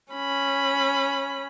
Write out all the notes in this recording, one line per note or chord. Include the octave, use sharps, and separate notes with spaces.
C#4 B5